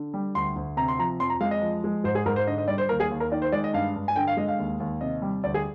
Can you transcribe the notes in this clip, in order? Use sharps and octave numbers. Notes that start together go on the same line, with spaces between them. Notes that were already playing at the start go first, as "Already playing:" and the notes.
Already playing: D3
G3
D2 C6
D2
C3 A#5
C6
F3 A#5
F2 C6
A#5
G#3 F5
D#5
F3
G#3
G#2 C5
G#4
G#2 A#4
C5
D3 D#5
D#5
G3 D5
C5
D#2 A#4
G#4
D#2
A#4
D#3 D5
C5
G#3 D5
D#5
G2 F5
G2
G#5
D3 G5
F5
G#3 D#5
F5
D#2
D#2
C3 D#5
G3
D2 D5
G#4